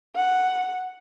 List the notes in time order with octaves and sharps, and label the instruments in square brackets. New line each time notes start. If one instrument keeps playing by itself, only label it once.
[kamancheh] F#5